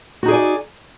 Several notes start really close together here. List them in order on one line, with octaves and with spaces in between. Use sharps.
F#4 D#4 G#4 D5 G#5